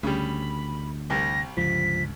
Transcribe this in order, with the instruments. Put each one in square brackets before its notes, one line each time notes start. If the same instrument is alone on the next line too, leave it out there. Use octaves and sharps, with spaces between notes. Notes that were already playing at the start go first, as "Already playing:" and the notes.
[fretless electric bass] D2 [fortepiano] C#3 G3 [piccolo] B5
[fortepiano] C2 G3 [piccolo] A#6
[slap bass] C#2 G2 D3 [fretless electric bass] F3 [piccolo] B6